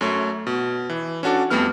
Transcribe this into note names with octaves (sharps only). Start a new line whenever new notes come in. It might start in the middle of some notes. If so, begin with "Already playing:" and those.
F#2 A3 C#5
B2
E3
C#4 D4 F#4 A4 D5
F2 G3 A3 B3 F6